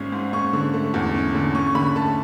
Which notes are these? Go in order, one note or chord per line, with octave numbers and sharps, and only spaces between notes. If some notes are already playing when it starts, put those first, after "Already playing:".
Already playing: G#1 G#2 G#3 C#4
G#2
C#4 C#6
D3
A3
E2
C#4
D3
C#4 C#6
C#6
D3 B5
A3 A5